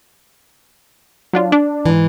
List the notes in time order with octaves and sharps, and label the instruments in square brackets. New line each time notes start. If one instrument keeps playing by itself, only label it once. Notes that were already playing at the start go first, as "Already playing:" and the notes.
[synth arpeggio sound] F#3 D4 F4
D4
[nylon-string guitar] G#2 E3